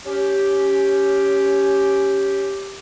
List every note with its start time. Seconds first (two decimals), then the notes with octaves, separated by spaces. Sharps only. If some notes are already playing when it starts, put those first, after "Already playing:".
0.06 C#4 G4